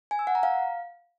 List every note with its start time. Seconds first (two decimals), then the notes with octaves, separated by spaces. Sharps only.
0.11 G#5
0.19 E6
0.27 F#5
0.35 A#5
0.43 F5